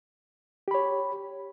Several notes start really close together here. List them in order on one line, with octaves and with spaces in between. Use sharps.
G4 B5 C#5